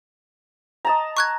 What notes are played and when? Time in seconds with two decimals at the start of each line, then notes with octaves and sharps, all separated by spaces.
0.85 D#5 A5 A#5
1.17 C#6 F#6 G#6